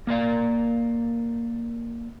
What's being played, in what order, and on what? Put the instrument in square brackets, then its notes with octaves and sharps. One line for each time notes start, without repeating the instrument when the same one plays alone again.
[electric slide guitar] A#3 A#4 D5 F5